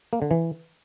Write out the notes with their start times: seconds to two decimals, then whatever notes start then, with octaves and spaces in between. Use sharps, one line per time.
0.13 A#3
0.22 D3
0.31 E3